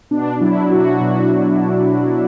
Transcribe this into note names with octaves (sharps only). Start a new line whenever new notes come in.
B2 D4
F#3 E4
F#3 F#4
F#4
B2
F#4